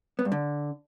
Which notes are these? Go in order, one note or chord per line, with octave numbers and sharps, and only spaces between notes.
B3
G2
D3